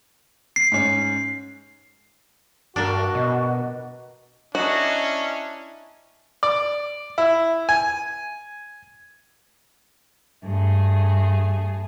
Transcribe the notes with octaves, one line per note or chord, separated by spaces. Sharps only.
C7
G#2 C#4
G2 A#3 D4 F#4
B2 D#5
C#4 D4 E4 F#4 D#5 A#5 D#6
D5
E4
G#5
G2 A3 G#4